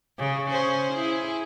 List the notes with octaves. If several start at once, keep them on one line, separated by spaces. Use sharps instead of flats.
C#3
C#4 G#4 C5
E4 G#4